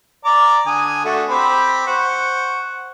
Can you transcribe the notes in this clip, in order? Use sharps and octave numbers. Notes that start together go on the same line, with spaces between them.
D5 A#5 D6
D3 G#5 D#6
A3 D4 F#4
C4 G4 B5
C5 F#5 C#6